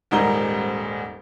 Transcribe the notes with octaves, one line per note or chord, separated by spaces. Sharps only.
D#1 G#2 G3 D#4 A#4 G7